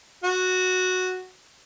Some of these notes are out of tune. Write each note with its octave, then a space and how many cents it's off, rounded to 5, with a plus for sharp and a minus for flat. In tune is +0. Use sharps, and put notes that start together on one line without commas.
F#4 -5